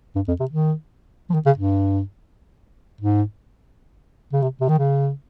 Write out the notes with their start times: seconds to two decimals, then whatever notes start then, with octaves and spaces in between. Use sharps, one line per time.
0.16 G2
0.28 F2
0.40 C3
0.51 D#3
1.30 F3
1.34 D#3
1.46 C#3
1.58 G2
3.01 G#2
4.33 C#3
4.42 C3
4.61 C3
4.69 D#3
4.78 C#3